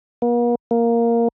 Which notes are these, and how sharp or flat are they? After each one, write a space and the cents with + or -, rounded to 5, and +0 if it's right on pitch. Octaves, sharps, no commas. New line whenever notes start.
A#3 +45
A#3 +0